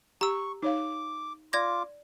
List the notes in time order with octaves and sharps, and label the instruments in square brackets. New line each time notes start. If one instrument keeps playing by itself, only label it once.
[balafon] G4 [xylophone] A#5 E6 [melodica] C#6
[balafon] D#4 C#5 F5 [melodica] D6
[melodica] F4 D6 [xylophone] D5 G#6 A#6